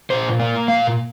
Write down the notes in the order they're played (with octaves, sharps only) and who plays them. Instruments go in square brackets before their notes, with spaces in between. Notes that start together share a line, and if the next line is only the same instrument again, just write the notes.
[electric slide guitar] A#2 C5
A#3
A#2 F5